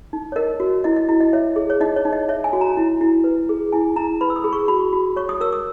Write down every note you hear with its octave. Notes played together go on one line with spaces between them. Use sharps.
D#4
C#5
A#4 D#5
F#4
E4 D#5
D#5
E4
D#5
C#5 E5
G#4
C#5
D#4 D#5
C#5
D#4
D#5
C#5 E5
G#5
F#4
A#5
E4
E4
B4
G#4
E4 G#5
E4 A#5
B4 B5
E6
D#6
G#4
C#6
F#4 B5
F#4
C#5 C#6
D#6
A#4 E6
D#6